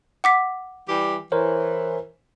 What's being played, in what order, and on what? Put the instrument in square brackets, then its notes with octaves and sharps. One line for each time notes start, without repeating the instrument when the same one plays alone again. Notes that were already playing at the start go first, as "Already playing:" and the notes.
[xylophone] F#5 D6 B6
[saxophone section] E3 G3 G4
[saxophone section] E3 [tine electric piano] A#4 C5 C#5